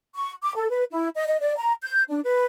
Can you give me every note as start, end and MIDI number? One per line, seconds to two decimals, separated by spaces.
0.15 0.32 85
0.43 0.54 86
0.55 0.68 69
0.70 0.84 71
0.91 1.08 64
1.16 1.25 75
1.27 1.39 75
1.40 1.53 74
1.58 1.73 82
1.82 2.02 91
2.10 2.20 62
2.24 2.45 71